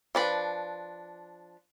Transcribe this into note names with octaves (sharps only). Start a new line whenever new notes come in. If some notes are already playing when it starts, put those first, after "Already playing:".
F3 D4 B4